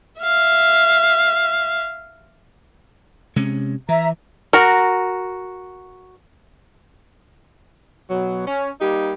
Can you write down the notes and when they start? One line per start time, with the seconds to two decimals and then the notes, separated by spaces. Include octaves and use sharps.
0.20 E5 F5
3.36 C3 G#3 C#4
3.89 E3 E5 A#5
4.53 F#4 A#4
8.10 B2 F#3
8.46 C#4
8.81 G3 A#3 D#4 G4